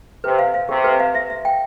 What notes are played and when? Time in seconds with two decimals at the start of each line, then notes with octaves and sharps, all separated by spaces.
0.24 C3 B4
0.39 F5
0.54 F5
0.69 C3 G4
0.84 B4
1.00 F5
1.15 E5
1.30 E5
1.45 G5